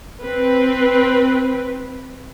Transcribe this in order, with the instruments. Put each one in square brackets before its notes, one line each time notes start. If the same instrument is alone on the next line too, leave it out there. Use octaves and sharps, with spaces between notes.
[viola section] C4 B4